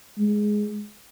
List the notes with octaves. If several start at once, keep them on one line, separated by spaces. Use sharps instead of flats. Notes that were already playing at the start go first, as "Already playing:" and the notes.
G#3